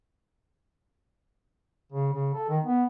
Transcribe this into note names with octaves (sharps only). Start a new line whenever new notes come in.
C#3
C#3
A4
D#3
B3